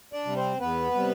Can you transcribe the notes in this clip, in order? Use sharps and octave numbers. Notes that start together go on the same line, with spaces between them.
D4 D5
C3 G3
C4 C5
E2 B3 B4
C3 G3